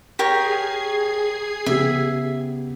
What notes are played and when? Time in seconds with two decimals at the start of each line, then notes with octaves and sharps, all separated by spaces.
0.19 G4 G#4 A#4 C#5 G#6 C7
1.66 C#3 B3 G4 E5